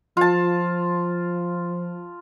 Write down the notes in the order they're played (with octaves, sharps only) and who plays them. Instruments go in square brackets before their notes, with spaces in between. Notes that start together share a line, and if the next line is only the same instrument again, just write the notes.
[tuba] F3 [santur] F4 A5